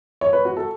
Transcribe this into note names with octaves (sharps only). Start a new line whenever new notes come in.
C#5
B4
F#4
A4